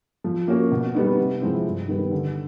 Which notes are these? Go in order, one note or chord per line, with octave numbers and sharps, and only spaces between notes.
F3
A#3 C#4 F#4
B2
G3 B3 D#4
C3
F3 G#3 C4 E4
G2
D#3 G3 B3
D3